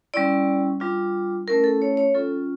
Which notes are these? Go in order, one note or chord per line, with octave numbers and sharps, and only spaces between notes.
G3 C#4 E4 D5
G3 D4 F4
A3 C#4 E4 A#4
A4
C#5
C#5
G3 C#4 F4 A4